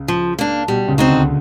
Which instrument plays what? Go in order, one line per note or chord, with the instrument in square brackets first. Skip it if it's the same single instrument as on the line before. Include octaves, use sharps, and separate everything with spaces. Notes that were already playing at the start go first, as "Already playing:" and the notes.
Already playing: [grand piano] C#2 C#3
[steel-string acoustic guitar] F3
A#3 D4
[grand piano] B2 [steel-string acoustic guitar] G3
[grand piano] C#2 C#3
[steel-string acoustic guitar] C4 D#4 F#4
[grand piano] D2 D3